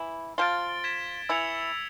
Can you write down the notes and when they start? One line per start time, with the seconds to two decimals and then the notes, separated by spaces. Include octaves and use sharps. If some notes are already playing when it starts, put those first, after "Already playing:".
Already playing: E3 E4
0.38 F3 F4 A6 D7 G7
0.84 G#6 B6 E7
1.29 E3 E4 E6 G#6 C#7 F7